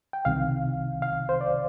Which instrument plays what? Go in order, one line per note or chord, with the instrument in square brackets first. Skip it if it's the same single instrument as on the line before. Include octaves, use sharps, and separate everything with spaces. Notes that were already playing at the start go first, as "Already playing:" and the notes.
[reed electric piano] G5
C2 C3 D#3 F5
F5
C5
D5